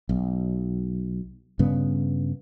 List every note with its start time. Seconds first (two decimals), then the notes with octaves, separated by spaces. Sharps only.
0.09 B1
1.59 G2 C#3 B3